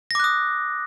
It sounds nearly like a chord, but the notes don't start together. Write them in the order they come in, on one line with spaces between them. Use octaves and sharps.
A#6 D6 F#6 D#6